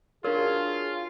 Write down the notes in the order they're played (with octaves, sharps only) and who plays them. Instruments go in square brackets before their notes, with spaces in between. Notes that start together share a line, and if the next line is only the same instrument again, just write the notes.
[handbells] D4 C#5 [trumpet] F4 [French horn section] F#4 G#4 [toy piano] A#4